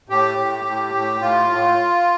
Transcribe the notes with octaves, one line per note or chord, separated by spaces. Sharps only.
A2 G4
A2
A2
A2
A2 F4
A2